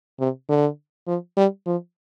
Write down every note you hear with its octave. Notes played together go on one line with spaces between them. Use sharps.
C3
D3
F3
G3
F3